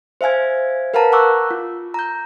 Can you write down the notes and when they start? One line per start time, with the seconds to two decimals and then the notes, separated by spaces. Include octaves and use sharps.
0.21 C5 E5 F5 G#5 G#6
0.94 A#4 B4 F5 F#5 A5 A#5
1.12 F#5 A#5 C#6 D6 E6 F#6
1.51 F4
1.94 A#5 G6